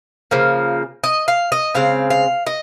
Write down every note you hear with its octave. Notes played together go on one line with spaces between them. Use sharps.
C#3 F3 A#3
D#5
F5
D#5
C#3 G#3 C4 F5
F5
D#5